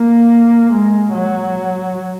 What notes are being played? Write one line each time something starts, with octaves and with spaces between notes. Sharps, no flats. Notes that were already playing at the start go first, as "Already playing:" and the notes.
Already playing: A#3
G#3
F#3